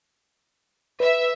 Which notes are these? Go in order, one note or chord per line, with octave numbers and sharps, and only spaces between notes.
B4 E5